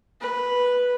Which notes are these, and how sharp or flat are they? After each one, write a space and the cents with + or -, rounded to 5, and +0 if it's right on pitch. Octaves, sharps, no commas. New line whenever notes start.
B4 -5